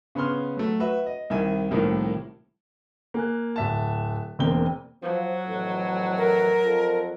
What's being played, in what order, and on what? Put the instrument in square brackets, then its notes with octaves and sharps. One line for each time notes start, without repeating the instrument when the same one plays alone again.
[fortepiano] C#3 B3 C#4 C6 F6
F#3 A3
F#4 B4 E5
D#5
C2 D#3 E4 E5 G#5
C2 A2 D#3 F3 A#3
[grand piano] A#3 G#5 F#6
D1 E5 A5
E1 A#3 C4 G5 G7
[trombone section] F3 [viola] F#3
[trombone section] F2 A2 E3
[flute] A#4
[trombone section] F2 F4 A4